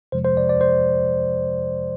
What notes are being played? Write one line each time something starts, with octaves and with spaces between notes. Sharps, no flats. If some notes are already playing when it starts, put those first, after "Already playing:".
F2 C3 F3 G#3 C5
C5
D5
D5
C5